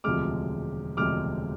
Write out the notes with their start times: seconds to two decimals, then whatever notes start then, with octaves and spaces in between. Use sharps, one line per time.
0.04 E1 D2 C3 F3 G#3 D6 F6
0.97 E1 D2 C3 F3 G#3 D6 F6